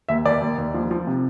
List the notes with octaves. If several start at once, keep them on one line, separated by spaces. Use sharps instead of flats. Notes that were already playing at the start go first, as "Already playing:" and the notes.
D#2 E5
D#2 D5
D#2
D#2
F3
F3
C3